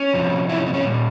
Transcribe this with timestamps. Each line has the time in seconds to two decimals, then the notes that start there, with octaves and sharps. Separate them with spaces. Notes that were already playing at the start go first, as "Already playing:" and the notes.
Already playing: C#4
0.13 F2 C3 F3
0.49 E4
0.58 C#4
0.66 C4
0.74 C#4
0.84 A#2 G3